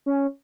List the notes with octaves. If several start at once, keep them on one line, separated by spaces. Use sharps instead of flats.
C#4